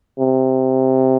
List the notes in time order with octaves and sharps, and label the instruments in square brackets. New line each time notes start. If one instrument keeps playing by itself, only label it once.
[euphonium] C3